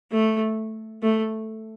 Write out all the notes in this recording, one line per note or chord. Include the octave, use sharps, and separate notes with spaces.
A3
A3